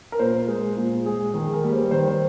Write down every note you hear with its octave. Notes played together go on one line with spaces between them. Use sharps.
A#4
A#2 C5
G#3
A#2
G#3 G#4
D#3 G#4
A#4
G3 A#3
C5
D#3 C5
C5